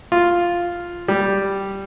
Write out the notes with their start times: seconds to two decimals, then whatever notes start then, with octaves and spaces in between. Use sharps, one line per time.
0.12 F4
1.08 G3